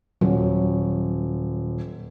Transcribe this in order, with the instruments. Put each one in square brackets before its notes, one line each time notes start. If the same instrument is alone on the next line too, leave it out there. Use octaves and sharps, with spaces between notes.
[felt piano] D#1 [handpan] F#3